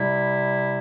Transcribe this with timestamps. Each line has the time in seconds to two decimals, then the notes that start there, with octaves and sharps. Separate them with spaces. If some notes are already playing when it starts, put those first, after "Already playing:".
Already playing: C3 G3 E4